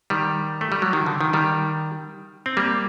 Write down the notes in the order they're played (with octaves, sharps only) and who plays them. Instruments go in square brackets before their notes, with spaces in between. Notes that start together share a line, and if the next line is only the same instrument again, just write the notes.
[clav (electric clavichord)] D#3 G3
A3
G3
F#3
D#3
D3
D#3
D#3 G3
C4
G3 A#3